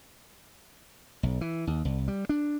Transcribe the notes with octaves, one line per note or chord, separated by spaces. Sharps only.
B1
E3
D#2
C2
G3
D4